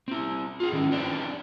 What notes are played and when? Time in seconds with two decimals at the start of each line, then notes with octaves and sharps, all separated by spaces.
0.08 C4 E4
0.60 F4 G#4
0.72 D3 D#3 C#4 E4
0.91 C4 D4 E4 B4 D5 G5